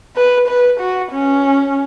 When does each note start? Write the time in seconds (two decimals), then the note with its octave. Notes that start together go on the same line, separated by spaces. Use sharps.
0.16 B4
0.48 B4
0.80 F#4
1.12 C#4